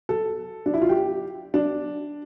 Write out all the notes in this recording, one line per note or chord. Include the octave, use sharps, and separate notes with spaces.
A4
D4
E4
F4
G4
D4